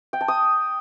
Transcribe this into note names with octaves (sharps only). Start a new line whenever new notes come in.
G5
A5
D#6